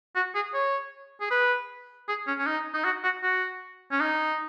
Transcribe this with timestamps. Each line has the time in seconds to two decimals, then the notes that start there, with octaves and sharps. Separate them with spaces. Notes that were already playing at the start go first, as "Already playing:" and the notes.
0.15 F#4
0.35 G#4
0.54 C#5
1.20 G#4
1.31 B4
2.08 G#4
2.27 C#4
2.39 C#4
2.46 D#4
2.74 D#4
2.84 F#4
3.03 F#4
3.23 F#4
3.91 C#4
4.00 D#4